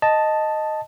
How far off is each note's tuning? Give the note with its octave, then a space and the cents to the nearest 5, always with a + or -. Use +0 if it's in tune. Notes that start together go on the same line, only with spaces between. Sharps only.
D#5 +0 A5 +0